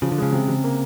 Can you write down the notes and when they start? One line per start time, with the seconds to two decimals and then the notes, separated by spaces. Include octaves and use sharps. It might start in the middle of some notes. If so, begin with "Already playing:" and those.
0.02 C#3 F3
0.12 D3
0.18 C#3 G#3
0.32 C3
0.48 C3
0.64 A#3